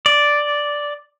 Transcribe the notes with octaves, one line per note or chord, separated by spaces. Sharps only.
D5